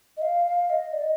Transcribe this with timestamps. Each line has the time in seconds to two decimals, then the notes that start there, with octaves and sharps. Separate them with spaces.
0.17 D#5
0.22 F5
0.46 F5
0.70 D#5
0.93 D5
1.02 D#5